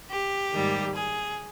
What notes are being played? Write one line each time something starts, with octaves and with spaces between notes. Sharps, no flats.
G4
G#2 D#3 G3 A#3
G#4